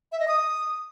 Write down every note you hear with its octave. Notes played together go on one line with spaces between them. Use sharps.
E5
D#5
D#6